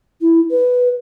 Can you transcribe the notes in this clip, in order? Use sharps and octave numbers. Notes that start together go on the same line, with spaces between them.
E4
B4